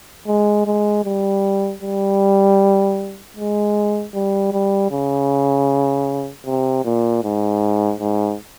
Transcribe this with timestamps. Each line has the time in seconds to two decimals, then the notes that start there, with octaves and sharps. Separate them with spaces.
0.27 G#3
0.66 G#3
1.05 G3
1.82 G3
3.37 G#3
4.14 G3
4.52 G3
4.91 C#3
6.46 C3
6.85 A#2
7.23 G#2
8.00 G#2